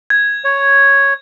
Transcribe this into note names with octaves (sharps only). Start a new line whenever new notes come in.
G#6
C#5